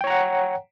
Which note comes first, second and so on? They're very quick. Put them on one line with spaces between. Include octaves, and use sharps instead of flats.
G5 C#5 A#5 F#5